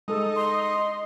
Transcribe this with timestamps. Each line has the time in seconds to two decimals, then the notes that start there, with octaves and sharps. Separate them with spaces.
0.08 G#3 D#4 A4
0.36 D#5 C6